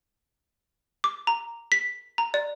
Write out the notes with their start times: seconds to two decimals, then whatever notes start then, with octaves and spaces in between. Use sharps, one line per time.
1.04 D6
1.27 A#5
1.72 B6
2.18 A#5
2.34 D5